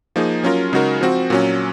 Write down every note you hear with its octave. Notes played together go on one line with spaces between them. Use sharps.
F3 A#3 D#4 G#4
F#3 C#4 F4 A#4
C#3 G#3 D#4 F#4 A#4
F3 C4 F#4
A#2 F#3 C#4